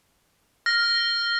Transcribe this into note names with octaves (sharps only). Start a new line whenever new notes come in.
F6 A#6